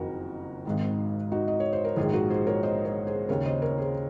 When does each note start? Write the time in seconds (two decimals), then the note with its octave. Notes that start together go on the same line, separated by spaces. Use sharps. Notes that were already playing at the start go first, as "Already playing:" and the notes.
Already playing: F#1 F2 D#3 F#4 A#4
0.65 G#1 G#2 D#3
1.32 D#4 F#4
1.48 D#5
1.60 C#5
1.73 C5
1.85 A#4
1.96 A#1 G#2 D#3 F4 G#4
2.13 F#4 A#4
2.30 G#4 C5
2.47 A#4 C#5
2.63 C5 D#5
2.84 A#4 C#5
3.07 G#4 C5
3.29 D#2 C#3 A#4 C#5
3.45 C5 D#5
3.62 A#4 C#5
3.78 G#4 C5